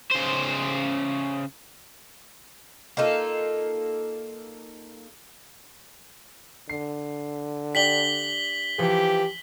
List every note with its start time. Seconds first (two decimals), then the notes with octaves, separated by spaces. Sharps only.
0.11 C#3 C5
2.97 A#3 D#4 F4 A4
6.69 D3 C7
7.75 D4 G4 B6 F#7 G7
8.79 E3 F3 G4